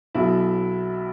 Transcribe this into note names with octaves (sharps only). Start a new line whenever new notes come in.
B1 B2 F#3 E4